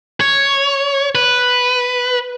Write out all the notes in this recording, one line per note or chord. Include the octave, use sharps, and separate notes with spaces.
C#5
B4